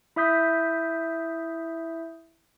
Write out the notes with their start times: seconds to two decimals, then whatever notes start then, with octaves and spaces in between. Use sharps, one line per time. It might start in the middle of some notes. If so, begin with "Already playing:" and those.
0.16 E4 E5 D#6 G6 B6